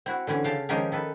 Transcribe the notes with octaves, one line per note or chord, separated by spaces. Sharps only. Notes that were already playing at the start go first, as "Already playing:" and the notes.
C4 E4 F#4
D3 E3 C4 C#4
C#3 F5 G5 A5
D#3 F3 G#3 C#4 G4 A#4
D#3 A4 B4